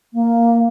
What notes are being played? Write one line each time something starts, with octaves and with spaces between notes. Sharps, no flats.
A#3